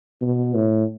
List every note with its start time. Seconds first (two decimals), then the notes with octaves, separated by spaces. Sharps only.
0.22 B2
0.55 A2